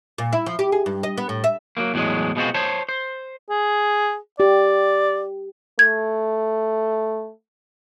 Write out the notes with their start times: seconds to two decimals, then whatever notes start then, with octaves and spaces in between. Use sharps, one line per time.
0.18 A#2
0.33 E4
0.46 F3
0.59 G4
0.72 G#4
0.86 G2
1.03 D#5
1.18 B3
1.29 A2
1.44 E5
1.77 F#3 A3 A#3
1.94 E2 A2 F#3 G#3
2.36 B2 G#3 C4 F4 F#4
2.54 C5 C#5 A5
2.89 C5
3.50 G#4
4.40 G4 D5
5.79 A3 G#6